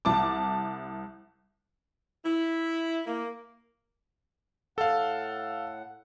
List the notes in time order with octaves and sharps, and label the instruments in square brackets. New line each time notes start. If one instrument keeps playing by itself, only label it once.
[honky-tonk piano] C2 A5 D6
[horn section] E4
A#3
[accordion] A2 F#5 [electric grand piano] A4 F5